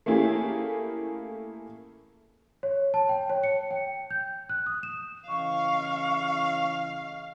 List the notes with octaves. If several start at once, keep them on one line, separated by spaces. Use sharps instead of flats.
A3 A#3 C#4 E4 G4 G#4
C#5
A5
G5
C#5
C#7
G5
G6
F#6
D#6
E7
C#3 E3 D#5 F5 C#6